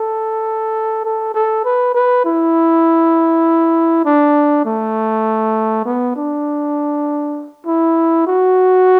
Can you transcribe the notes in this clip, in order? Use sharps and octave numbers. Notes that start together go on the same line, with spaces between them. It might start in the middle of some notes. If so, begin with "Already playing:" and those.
Already playing: A4
A4
A4
B4
B4
E4
D4
A3
B3
D4
E4
F#4